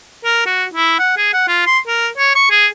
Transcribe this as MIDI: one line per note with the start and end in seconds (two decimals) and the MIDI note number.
0.25 0.42 70
0.46 0.65 66
0.74 0.94 64
0.99 1.14 78
1.17 1.31 68
1.34 1.46 78
1.48 1.63 65
1.66 1.79 84
1.87 2.08 70
2.18 2.34 73
2.35 2.50 85
2.51 2.67 68